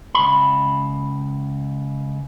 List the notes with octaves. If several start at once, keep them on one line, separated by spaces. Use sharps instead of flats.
C#2 B5